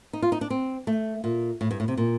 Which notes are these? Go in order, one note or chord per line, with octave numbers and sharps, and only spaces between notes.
D#4
F4
D#4
D4
C4
A3
A#2
A2
G2
A2
C3
A#2